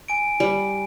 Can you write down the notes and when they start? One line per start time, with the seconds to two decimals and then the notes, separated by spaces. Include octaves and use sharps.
0.08 G#5 D7
0.40 G3